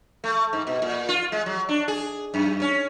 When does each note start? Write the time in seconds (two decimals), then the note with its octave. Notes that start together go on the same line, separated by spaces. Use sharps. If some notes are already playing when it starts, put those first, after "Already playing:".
0.24 A3
0.53 G#2
0.67 B2
0.82 A#2
1.09 F4
1.32 G#3
1.46 F#3
1.69 D4
1.88 G#4
2.34 F#2
2.62 C#4